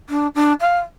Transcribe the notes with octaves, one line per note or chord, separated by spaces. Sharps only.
D4
D4
F5